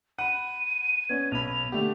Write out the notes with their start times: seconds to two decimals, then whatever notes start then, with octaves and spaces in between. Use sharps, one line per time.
0.19 F#5 B5 D#7
1.09 B3 C#4 G#6
1.32 B1 B5 F7
1.72 D3 A3 G4